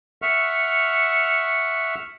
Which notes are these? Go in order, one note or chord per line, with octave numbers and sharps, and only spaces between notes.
E5 F#5 C#6 F6